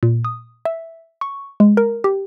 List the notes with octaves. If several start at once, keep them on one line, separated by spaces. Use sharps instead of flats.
A#2
D#6
E5
C#6
G#3
A#4
G4